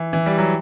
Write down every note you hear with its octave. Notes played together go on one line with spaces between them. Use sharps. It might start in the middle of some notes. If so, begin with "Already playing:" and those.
Already playing: E3
E3
G3
F#3